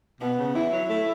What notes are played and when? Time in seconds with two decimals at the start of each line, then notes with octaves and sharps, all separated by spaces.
0.20 B2 B3
0.38 C#3
0.55 E3 E4
0.72 F#3
0.90 A3